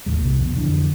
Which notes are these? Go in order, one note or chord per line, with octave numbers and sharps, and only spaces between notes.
D#2 A2 G#3
C2 A#2
F2 B2 D#3
F2 D3 E3